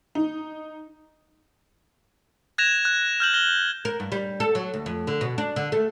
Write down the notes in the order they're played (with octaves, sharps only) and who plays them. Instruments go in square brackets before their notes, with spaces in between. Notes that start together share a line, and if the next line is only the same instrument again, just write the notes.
[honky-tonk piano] D#4
[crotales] F#6 G#6 A#6 E7 F7
F#6
F6 G6 F#7
F6 A#6 G7
[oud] A#4
G2
G3
A4
F#3
D2
F2
D3
B2
D4
D3
A3